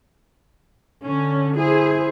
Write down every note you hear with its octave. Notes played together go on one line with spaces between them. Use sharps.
D3 C#4
E4 G#4 C5